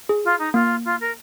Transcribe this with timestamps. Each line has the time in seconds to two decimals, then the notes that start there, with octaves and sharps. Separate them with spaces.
0.09 G#4
0.24 F4
0.39 D#4
0.54 A#3 F4
0.85 F4
1.00 A#4